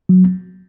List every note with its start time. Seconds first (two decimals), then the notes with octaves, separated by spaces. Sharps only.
0.09 F#3